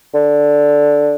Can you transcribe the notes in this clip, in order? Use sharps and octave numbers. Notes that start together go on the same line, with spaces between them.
D3